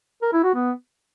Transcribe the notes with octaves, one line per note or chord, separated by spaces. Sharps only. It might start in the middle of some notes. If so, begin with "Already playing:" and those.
A#4
E4
F#4
B3